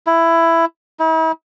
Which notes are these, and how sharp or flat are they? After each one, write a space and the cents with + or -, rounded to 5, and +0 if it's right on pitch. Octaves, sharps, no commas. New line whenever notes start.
E4 +10
E4 -45